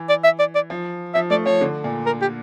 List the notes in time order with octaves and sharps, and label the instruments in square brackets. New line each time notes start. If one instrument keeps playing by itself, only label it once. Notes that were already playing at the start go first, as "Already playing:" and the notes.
Already playing: [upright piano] E3
[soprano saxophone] D5
E5
D5
D5
[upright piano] F3
[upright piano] F3 [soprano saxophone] E5
[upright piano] A3 [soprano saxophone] D5
[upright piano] F3 [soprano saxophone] C#5
[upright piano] D3
A#2
[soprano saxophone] A#4
G4